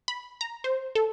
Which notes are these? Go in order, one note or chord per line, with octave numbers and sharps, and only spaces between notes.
B5
A#5
C5
A4